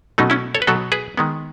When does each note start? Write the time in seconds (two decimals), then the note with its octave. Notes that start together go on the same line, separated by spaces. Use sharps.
0.18 B2 F#3 A3 C#4 D#4
0.30 C#4 E4
0.55 A4 C#5
0.62 B4
0.67 B2 F#3 B3 F#4 A4
0.92 G#4 B4
1.17 D#3 G#3 B3